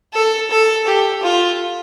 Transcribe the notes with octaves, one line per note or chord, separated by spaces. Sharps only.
A4
A4
G4
F4